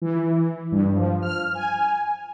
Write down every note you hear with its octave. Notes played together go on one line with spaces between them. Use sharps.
E3
G2
F3
F6
G#5